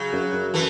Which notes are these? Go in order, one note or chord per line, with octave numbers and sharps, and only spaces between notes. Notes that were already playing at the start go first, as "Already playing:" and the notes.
Already playing: C#3 F#3
F#2
F#2
E3 A3